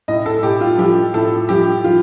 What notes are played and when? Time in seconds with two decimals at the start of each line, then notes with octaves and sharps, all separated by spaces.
0.08 A2 D#5
0.26 A4
0.43 A2 G4
0.61 F4
0.78 F3 G4
1.14 A2 A4
1.49 F3 G4
1.84 F3 F4